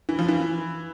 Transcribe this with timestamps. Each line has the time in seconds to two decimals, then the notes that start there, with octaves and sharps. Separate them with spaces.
0.09 E3
0.19 F3
0.29 E3